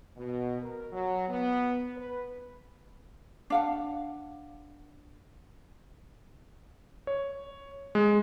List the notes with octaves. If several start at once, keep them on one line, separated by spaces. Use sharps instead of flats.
B2
A#4
F#3
B3
B4
D4 F5 F#5
C#5
G#3